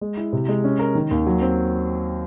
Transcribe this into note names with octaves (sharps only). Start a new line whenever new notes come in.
G#3
E4
C3
G#3
C#4
A#4
D#3
D#2
F#3
C4